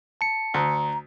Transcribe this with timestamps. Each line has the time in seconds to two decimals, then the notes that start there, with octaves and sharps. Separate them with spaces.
0.21 A5 C#7
0.54 D2 A#5